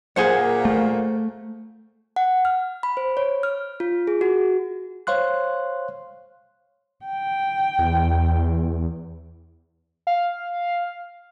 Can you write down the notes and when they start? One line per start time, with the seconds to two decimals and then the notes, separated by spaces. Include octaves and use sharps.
0.16 A#2 A#3 G#4 C5 F#5
0.65 A3
2.16 F#5
2.45 F6
2.83 B5
2.97 C5
3.17 C#5
3.43 F6
3.80 F4
4.07 G#4
4.21 F#4
5.07 C5 C#5 F5 C6 F#6
7.05 G5
7.79 E2
10.07 F5